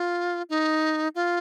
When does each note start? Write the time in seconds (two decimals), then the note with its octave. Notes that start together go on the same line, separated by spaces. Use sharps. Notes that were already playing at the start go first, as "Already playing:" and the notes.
Already playing: F4
0.50 D#4
1.15 F4